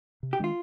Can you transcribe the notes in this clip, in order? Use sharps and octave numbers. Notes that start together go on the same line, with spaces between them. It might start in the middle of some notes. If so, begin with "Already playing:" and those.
C3
G4
D#3 G#3 D4 F4